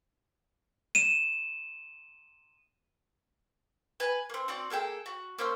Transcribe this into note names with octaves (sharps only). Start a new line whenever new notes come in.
D#7 E7
B4 G#5
A#3 C4
C4 F#4 D5
A#3 G#4 A4 G5
F#4
A#3 C#4 C5 E6